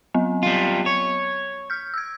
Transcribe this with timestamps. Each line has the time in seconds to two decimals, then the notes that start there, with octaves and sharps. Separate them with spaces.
0.14 F#3 B3
0.43 G3 F4
0.86 C#5
1.70 F6 G6
1.94 E6 G#6